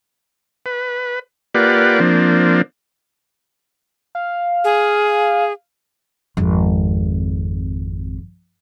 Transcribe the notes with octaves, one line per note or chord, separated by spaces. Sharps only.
B4
A#3 F4 G4 B4 D5 F#5
F3 A#3 C4 D4
F5
G#4
G#1 F2